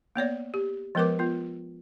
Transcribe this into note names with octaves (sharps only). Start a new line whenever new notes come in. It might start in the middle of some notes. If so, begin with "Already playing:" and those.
A#3 B3 C#5 D5
G4
F3 G#3 B3 A#4 B4 D6
B3 F4